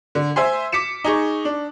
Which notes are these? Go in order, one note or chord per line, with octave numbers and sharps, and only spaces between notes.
D3
C5 E5 G#5 C6
D6 B6 C#7 E7
D#4 G#4 C#6
D4